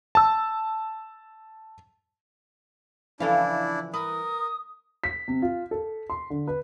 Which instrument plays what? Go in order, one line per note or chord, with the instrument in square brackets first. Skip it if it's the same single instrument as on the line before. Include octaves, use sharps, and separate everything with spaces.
[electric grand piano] A5 E6
[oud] C#3 F3 F5 [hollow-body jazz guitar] E3 A4 [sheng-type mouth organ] D4 E4
[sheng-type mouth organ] A#4 [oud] B4 [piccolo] D#6
[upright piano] B6
C3
F4
A4
C6
D3
B4